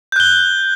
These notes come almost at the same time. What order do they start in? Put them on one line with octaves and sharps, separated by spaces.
G6 F#6 G7